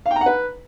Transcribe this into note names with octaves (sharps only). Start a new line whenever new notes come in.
F5
G5
A#5
F#5
B4